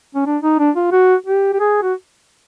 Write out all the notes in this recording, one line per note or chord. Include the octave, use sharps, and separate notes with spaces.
C#4
D4
D#4
D4
F4
F#4
G4
G4
G#4
F#4